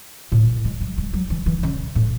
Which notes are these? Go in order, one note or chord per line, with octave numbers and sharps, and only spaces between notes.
A2
G#3
F#3
G#3
F#3
E3
E3
C#3
A2